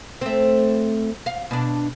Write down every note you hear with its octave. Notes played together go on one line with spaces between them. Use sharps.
A3 C4
F5
B2 D4